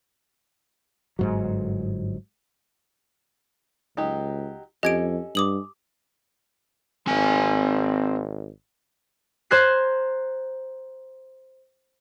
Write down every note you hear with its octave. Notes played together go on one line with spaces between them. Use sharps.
G1 G#2 F#3
C#2 F#3 D#4 G4
F2 C#4 G4 A4 D#5 G#6 D7
G2 D6 D#6 F#7
G#1 C4 G#5
C5 A#5 C6 F#6 G#6 C7